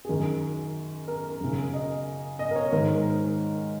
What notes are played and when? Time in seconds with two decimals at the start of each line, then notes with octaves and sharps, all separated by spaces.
0.05 G#4
0.09 F#2 D#3 A#4
1.08 A#4
1.41 F#2 C#3
1.73 D#5
2.39 D#5
2.51 A#4
2.56 C#5
2.72 G#2 D#3 A#4